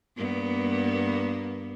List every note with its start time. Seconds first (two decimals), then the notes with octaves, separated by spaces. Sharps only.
0.17 G2 A#3 B3